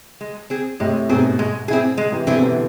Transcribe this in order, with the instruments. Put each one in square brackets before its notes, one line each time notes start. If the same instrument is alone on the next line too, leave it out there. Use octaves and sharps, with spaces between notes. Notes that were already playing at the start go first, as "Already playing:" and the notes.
[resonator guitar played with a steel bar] G#3
C4 G#4
[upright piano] A2 C3 [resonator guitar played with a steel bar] G#3
[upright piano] G#2 B2 [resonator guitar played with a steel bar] C4 G#4
[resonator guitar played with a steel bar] G#3
C4 E4 G#4
G#3
[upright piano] C3 E3
[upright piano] B2 D3 [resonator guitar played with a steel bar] C4 E4 G#4
[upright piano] C3 E3